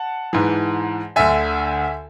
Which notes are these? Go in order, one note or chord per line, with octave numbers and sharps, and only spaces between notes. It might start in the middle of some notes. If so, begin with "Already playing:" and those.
Already playing: F#5 A5
G#2 E3
D2 D3 E5 G#5